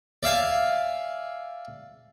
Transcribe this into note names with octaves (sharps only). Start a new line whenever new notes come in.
D5 E5 F5 G#5